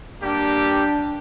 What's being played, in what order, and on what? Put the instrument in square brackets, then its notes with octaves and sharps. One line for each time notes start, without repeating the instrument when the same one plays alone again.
[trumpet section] G3 A#3 G4 [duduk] D4